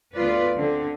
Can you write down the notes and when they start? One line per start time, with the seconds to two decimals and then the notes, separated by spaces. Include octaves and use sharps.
0.15 D2 B3 F4 B4 D5
0.57 D3 C4